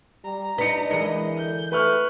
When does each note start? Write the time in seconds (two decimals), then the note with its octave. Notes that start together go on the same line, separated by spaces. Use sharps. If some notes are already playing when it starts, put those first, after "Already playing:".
0.24 G3 A#5
0.58 D4 D#4 B4 B6 C#7
0.91 E3 G#3 A#4 D#5 C#7
1.38 D3 G6
1.72 A3 B4 C#6 F6